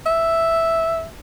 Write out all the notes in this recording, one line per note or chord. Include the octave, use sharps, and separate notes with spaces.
E5